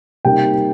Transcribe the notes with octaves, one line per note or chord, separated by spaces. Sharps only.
C3 G3 A#3 D#4 G5